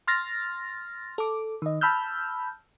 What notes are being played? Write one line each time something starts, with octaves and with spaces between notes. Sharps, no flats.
C6 F6 A6 A#6
A4 D6
D#3 D#5
A5 B5 E6 F6 G6